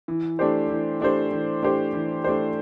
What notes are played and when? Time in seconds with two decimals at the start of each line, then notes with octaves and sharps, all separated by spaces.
0.08 E3
0.39 A3 D4 G4 C5
0.70 E3
1.01 A3 D4 G4 C5
1.32 E3
1.63 A3 D4 G4 C5
1.93 E3
2.24 A3 D4 G4 C5